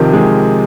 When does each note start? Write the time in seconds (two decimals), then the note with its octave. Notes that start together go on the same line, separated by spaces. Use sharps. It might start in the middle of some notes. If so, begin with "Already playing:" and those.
Already playing: C3 D#3 F3
0.13 D#3 G#3